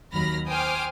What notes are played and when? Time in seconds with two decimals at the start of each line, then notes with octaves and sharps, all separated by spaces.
0.13 D#2 F#3 B5 F6 A#6
0.48 C5 G5 G#5 D6 D#6 F6